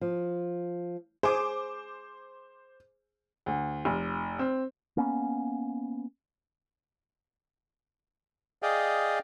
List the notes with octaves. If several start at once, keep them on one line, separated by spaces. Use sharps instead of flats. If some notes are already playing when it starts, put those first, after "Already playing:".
F3
G#4 C5 D6
D2
F1
C4
A#3 B3 C#4
G#4 D5 D#5 F5 G5